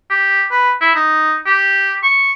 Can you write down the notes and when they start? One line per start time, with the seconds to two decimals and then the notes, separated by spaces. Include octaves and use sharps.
0.10 G4
0.51 B4
0.81 E4
0.95 D#4
1.46 G4
2.03 C#6